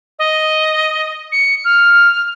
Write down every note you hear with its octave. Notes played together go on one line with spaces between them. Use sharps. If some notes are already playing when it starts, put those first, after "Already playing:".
D#5
C#7
F6